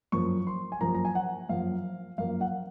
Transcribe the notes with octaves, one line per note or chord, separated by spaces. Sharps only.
F#2 F3 A#3 C#6
C6
G#5
F#2 F3 A#3 A#5
A#5
G#5
F#5
F#2 F3 A#3 F5
F#2 F3 A#3 F5
F#5